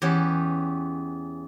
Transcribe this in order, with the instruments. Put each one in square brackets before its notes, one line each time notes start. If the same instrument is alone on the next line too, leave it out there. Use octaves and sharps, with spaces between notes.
[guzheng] E2 C#4 G4 B4